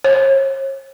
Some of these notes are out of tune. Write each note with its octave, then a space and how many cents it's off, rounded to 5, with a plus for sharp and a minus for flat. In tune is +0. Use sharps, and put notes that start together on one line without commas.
C#5 -45